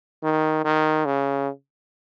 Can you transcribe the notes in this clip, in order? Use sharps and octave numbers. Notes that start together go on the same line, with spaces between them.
D#3
D#3
C#3